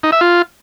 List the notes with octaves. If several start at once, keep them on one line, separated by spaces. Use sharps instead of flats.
D#4
E5
F4